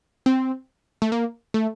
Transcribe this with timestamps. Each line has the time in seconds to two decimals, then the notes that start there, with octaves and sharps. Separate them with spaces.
0.26 C4
1.02 A3
1.12 A#3
1.54 A3